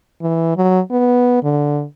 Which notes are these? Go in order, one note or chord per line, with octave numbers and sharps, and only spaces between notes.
E3
F#3
B3
D3